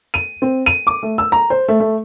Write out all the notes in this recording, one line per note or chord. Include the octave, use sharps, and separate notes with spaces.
D#7
C4
D#7
D6
A3
E6
A#5
C5
A3
A3